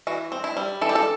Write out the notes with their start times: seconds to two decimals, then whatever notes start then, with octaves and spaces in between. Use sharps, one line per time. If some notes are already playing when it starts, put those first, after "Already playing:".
0.07 E3 F#4
0.32 C4
0.44 E4
0.57 G3
0.81 E3 A4
0.89 G4
0.95 A4